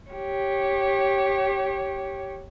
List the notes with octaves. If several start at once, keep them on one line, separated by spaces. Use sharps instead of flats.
G4 C#5